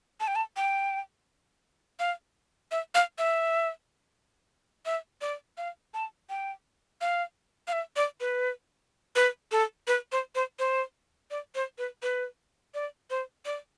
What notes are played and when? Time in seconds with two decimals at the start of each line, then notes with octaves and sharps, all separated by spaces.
0.20 A5
0.28 G5
0.36 A5
0.57 G5
2.00 F5
2.71 E5
2.95 F5
3.18 E5
4.86 E5
5.21 D5
5.57 F5
5.94 A5
6.30 G5
7.01 F5
7.68 F5
7.73 E5
7.96 D5
8.20 B4
9.16 B4
9.52 A4
9.88 B4
10.12 C5
10.35 C5
10.59 C5
11.31 D5
11.55 C5
11.78 B4
12.03 B4
12.74 D5
13.10 C5
13.46 D5